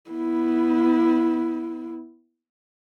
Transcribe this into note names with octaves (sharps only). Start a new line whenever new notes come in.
B3 E4